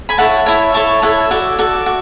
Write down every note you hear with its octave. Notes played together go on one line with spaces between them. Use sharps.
G#5 B5
E4 A4 C#5 F#5 A5
E4 A4 C#5
E4 A4 C#5 A5 C#6
E4 A4 C#5 F#5 A5
F#4 A4 D5 E5
F#4 A4 D5
F#4